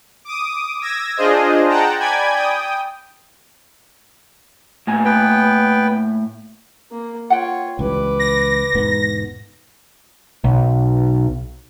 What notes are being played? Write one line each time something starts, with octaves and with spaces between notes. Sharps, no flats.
D6 D#6
E6 G#6 A#6
D4 F4 G#4 C5 D#5
F#5 G5 A5 A#5
D5 G5 G#5 B5 G#6
G5 D#6
A2 A#3 G#5
B3 B4 G5
A#3
F4 C#5 F#5 G5
C#2 E3 G3 B4 D6
A#6
E1 G#2 B3
B1